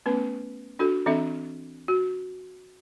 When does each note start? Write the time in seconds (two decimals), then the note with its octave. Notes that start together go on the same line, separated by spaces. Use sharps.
0.06 A3 B3 C#4 B4
0.79 D4 F#4 A4
1.06 E3 C4 D4 A4 E5
1.88 F#4